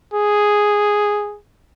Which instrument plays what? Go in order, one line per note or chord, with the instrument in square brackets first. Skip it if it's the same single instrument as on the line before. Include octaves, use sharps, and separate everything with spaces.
[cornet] G#4